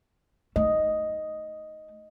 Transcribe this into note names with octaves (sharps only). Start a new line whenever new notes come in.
A3 D#5